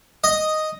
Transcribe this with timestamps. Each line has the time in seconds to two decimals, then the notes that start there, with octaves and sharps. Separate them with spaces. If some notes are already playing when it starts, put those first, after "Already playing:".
0.24 D#5